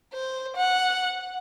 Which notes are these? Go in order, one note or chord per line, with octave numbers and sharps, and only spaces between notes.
C5
F#5